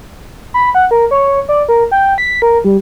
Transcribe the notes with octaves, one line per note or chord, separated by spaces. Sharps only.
B5
F#5
A#4
C#5
D5
A#4
G5
B6
A#4
G3